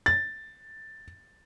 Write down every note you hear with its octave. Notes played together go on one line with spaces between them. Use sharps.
A6